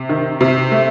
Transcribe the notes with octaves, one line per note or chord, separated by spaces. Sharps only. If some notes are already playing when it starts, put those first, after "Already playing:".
Already playing: C3
D#3
C3
A3